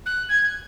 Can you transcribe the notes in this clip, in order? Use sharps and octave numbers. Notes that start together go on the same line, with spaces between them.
F#6
G#6